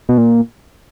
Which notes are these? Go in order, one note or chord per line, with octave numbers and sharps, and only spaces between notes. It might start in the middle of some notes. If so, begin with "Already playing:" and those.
B2
A#2